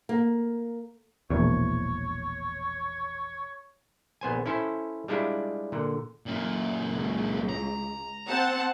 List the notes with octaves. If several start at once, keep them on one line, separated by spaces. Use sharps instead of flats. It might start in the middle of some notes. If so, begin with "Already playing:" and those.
A#3
E1 A#1 E2 C#5
A#1 B3 C5 G#5
C#4 E4 A4 C5
G3 G#3 D4 E4 F4
A#2 D3
F#2 A#2
C#2
A#5
C4 F#5 A5